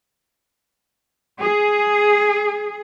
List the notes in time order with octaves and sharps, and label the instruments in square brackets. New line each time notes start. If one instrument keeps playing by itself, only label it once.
[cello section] G#4